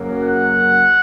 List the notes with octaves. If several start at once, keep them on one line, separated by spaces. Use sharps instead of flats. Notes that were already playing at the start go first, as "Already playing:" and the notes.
Already playing: F#2 C#3 F#3 A#3
F#5